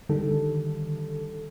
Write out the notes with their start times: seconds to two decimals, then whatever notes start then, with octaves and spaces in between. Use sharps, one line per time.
0.09 D3 D#3 G3 A4